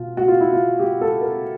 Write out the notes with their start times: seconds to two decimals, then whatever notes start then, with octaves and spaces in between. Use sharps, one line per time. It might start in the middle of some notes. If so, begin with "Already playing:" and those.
Already playing: B2 F4
0.17 F#4
0.28 F4
0.41 E4
0.53 F4
0.80 G4
1.01 A4
1.21 A#4